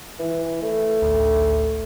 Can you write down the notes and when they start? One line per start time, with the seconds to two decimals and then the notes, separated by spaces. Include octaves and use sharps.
0.19 E3
0.62 A3
1.02 A1 D2